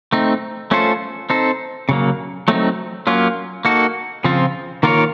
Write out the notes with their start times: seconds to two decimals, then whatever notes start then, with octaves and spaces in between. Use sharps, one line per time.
0.13 A3 C4 D#4
0.71 A3 C#4 F4 A4 C5
1.30 C4 D#4 A4 C5
1.89 C#3 F#3 A#3
2.48 F#3 A3 C4 D#4
3.07 F#3 A#3 C#4 F4
3.65 A#3 D#4 F#4 A4
4.24 C#3 F3 C4 F4
4.83 D#3 A#3 F4 A#4 C#5